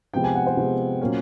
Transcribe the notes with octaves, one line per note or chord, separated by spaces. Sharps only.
C3 F3 G#3 B3 G5
G#5
F#5
C5
C3 F3 G#3 B3
A#2 F#3 A#3 C#4